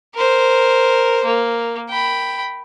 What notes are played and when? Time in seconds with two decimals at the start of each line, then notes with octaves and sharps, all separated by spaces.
0.15 A#4 C5
1.24 A#3
1.89 G5 B5